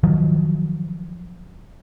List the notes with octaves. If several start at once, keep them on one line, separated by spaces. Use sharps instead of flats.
D#3 F3 F#3